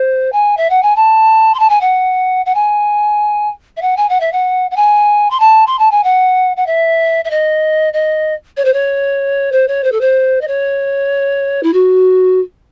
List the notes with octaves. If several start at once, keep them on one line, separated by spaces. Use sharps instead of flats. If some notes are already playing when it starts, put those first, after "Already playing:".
Already playing: C5
G#5
E5
F#5
G#5
A5
C6
A5
G#5
F#5
F#5
G#5
E5
F#5
G#5
F#5
E5
F#5
F#5
G#5
C6
A5
C6
A5
G#5
F#5
F#5
E5
E5
D#5
D#5
C#5
C5
C#5
C5
C#5
C5
A4
C5
D#5
C#5
E4
F#4